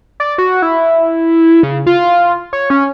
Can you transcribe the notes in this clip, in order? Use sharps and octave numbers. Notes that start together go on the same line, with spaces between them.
D5
F#4
E4
C#3
F4
C#5
C#4